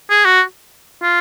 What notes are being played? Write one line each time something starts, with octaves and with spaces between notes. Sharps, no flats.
G#4
F#4
F4